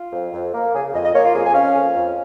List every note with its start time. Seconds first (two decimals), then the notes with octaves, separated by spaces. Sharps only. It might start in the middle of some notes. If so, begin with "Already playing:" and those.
Already playing: F4
0.12 F2
0.33 F2
0.54 A#3
0.74 C#3 G#4
0.94 F2 D#5
1.04 D#5
1.14 A#3 C#5
1.24 F4
1.34 F2 G#4
1.45 G#5
1.54 C#4 F5
1.74 F2
1.95 F2